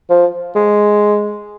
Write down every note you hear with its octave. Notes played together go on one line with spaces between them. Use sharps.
F3
G#3